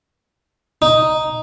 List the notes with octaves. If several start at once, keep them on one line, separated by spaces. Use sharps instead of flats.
D#4